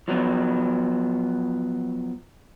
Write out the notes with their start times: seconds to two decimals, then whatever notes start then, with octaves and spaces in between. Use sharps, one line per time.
0.08 F3 F#3 B3